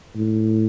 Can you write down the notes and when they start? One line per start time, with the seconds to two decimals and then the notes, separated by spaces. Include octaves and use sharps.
0.15 A2